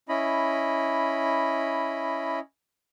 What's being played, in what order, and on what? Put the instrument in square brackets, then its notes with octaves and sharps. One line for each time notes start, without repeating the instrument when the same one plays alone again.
[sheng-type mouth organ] C#4 E4 D#5 B5